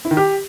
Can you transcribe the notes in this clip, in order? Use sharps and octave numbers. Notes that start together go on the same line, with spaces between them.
E4
D#3
G4